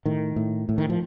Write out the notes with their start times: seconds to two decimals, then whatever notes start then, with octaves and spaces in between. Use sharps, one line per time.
0.06 A2 D#3
0.36 A2
0.69 A2
0.78 D#3
0.90 F3